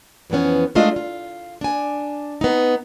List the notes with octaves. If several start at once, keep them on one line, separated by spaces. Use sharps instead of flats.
F2 E3 F3 B3 C#4
G#3 A3 D4 E4 F4 D#5
F4
D4 G#5
B3 D#4